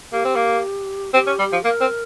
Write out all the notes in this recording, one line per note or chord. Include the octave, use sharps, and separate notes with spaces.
A#3 G4
C4
A#3
C4 G4
C#4
G3
F3
A#3 A#4
C4